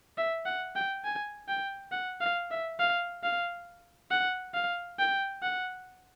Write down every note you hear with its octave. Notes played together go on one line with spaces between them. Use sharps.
E5
F#5
G5
G#5
G5
F#5
F5
E5
F5
F5
F#5
F5
G5
F#5